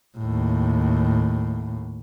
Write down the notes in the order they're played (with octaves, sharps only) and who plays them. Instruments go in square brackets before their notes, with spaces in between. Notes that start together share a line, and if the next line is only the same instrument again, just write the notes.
[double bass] D#2 A2